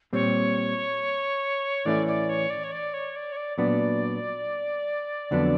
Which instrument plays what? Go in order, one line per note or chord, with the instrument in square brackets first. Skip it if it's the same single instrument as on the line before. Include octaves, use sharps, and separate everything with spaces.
[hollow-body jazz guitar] A#2 G3 C4 [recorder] C#5
[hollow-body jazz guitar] A2 E3 A3 C#4 E4 [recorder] D5
[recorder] D5
C#5
D5
C#5
D5
C#5
D5
C#5
D5
[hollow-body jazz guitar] A#2 F#3 B3 D4 [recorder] D5
[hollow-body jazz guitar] F2 D3 F#3 B3 D4